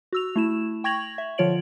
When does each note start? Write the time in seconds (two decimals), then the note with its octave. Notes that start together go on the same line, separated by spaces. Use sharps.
0.13 F#4 E6 F7
0.36 A3 E4 E7
0.84 G5 C#6 G#6 A#6 F7 F#7
1.18 E5
1.38 D3 F3 F4 C#5 D7 F#7